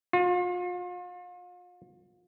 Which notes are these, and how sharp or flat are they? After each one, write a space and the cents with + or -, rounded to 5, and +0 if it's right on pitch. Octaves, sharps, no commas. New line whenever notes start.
F4 +40